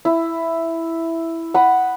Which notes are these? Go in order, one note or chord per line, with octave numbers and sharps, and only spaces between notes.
E4
F#5 B5 D#6